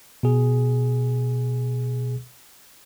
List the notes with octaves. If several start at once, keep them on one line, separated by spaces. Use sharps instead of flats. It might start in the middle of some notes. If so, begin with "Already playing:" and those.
B2 G#4